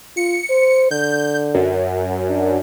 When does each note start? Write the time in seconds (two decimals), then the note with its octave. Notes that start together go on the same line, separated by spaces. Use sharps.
0.17 F4 C#7
0.50 C5
0.91 D3 G6
1.55 F#2
2.29 D4